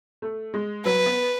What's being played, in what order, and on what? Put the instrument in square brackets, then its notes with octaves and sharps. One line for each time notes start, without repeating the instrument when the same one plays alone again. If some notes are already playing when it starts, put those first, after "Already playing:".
[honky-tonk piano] A3
G#3
[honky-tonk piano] F#3 [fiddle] B4
[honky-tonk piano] B3